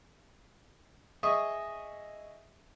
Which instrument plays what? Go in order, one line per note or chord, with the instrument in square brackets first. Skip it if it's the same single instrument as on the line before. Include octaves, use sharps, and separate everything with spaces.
[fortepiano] G#4 D#5 E5 C#6 D#6